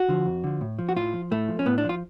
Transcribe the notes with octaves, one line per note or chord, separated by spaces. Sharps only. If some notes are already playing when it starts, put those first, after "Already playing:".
Already playing: F#4
D3 F3
F2
D3 F3
A2
F3
F#4
A2 F4
F3
A2 A3
F3
C#4
A2 B3
D4
F3
F4